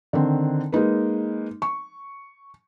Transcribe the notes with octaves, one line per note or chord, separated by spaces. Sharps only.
D3 D#3 C4
G#3 A#3 D#4 B4
C#6